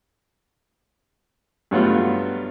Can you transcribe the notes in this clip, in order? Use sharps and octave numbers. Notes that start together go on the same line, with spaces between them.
G2 F#3 A3 B3 F4 C#5